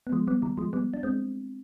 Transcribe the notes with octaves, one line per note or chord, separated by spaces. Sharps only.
B3
F3 G#3
G3 B3
D#3 G3
F3 G#3
G3 B3
D4
G#3 C4